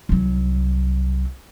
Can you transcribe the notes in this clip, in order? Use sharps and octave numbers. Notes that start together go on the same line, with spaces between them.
C2 F#3